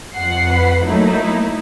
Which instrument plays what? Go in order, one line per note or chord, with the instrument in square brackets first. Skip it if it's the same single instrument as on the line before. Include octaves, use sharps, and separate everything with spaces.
[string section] F2 F#5 C7
[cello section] B4
[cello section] F#3 A3 [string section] A#3 D#4 E4